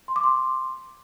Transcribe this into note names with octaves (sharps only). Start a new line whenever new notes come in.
C6
D6
C6